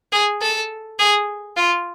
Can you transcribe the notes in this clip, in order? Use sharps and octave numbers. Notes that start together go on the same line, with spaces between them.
G#4
A4
G#4
F4